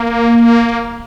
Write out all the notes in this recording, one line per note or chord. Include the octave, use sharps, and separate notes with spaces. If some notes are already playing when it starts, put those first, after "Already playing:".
Already playing: A#3